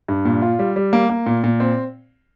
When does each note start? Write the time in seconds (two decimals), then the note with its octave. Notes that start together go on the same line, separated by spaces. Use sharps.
0.08 G2
0.25 A#2
0.42 F4
0.59 G3
0.76 G3
0.93 A#3
1.10 A#3
1.26 A#2
1.44 A#2
1.60 C4